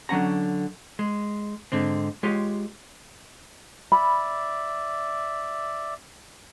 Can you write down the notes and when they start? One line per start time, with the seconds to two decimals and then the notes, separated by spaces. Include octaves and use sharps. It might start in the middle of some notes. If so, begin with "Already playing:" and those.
0.09 D3 F#3 C#4 F#5 A#5
0.99 G#3
1.72 G#2 D3 C4
2.23 G#3 F4 G4 C#5 D#5
3.92 D5 E5 B5